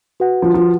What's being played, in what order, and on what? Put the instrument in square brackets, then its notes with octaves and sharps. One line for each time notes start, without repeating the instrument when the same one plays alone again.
[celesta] F#4 B4 F#5
[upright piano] F3
F3